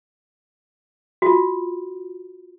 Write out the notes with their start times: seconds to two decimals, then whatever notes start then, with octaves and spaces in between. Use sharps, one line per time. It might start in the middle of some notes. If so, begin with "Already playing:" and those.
1.22 F4 F#4